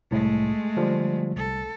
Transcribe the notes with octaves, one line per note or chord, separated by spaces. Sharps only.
C2 A2 G#3 A3
D3 F3 G3
C2 A4